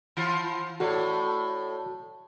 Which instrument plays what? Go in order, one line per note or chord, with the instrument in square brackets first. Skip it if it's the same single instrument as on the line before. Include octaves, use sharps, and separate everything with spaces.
[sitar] E3 F4
[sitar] A2 A3 [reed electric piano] F#4 A4 D5